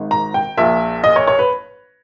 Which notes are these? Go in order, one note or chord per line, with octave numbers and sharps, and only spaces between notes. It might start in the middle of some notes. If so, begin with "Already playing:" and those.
Already playing: G#1 G#2 D#3
A#5
G5
A#1 A#2 E5
D#5
C#5
C#5
B4